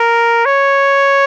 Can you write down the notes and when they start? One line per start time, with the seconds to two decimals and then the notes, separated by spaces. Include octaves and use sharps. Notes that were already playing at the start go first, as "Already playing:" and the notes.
Already playing: A#4
0.46 C#5